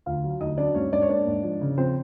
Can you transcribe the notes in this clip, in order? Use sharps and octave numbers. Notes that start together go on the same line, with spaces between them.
D2 F4 F5
F#3
D2 D#4 D#5
F#3 D4 D5
G#2 C#4 C#5
G#2 D4 D5
C#5
A#3 D4 D5
G#2
F3
C#3
F3 C4 C5